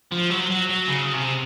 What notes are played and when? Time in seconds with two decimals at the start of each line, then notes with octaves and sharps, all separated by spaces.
0.12 F3
0.31 F#3
0.50 F#3
0.69 F#3
0.88 C#3
1.13 C3